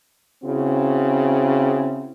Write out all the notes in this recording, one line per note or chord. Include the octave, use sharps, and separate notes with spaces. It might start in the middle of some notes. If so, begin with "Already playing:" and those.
C#3 C4 E4 F#4